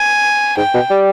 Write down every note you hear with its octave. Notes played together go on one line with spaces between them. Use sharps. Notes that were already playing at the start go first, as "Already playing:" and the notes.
Already playing: G#5
G#2 G5
B2
G3